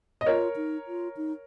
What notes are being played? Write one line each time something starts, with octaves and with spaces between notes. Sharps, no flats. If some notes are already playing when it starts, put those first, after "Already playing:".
D#5
F4 A#4 C#5
D#4
F4
D#4